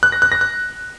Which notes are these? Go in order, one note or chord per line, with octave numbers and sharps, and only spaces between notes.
F#6
A#6
F#6
A#6
F#6